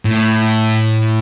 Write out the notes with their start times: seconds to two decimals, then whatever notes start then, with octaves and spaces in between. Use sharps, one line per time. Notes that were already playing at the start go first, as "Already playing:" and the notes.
0.05 A2